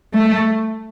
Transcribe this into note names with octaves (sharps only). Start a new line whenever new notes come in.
A3